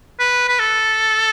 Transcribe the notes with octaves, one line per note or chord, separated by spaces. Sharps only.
B4
B4
A4